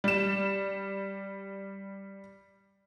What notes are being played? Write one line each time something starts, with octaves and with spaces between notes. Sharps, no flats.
G3 E7